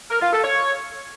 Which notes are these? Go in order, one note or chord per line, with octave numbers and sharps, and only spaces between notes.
A#4
F4
A4
C#5